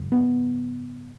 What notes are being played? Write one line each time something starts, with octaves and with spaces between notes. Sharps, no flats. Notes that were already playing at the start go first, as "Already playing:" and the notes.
Already playing: G#1 F#2 C#3
B3